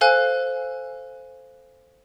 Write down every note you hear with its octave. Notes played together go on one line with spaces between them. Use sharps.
A4 C5 F5 G#5 F#6